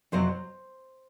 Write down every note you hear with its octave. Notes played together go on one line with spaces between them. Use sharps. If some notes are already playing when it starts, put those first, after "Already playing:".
F2 C3 F#3 C4 C5